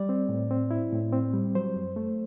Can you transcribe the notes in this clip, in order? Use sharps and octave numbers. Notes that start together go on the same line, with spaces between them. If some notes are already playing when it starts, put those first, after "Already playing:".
Already playing: G3 D5
C4
A2
C4
E4
A2
C4
G3
F#3 C5
F#2
A3